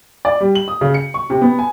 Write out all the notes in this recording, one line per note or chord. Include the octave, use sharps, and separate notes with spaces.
D5
G3
F#7
D#6
C#3
C#7
C#6
C3
B3
G#5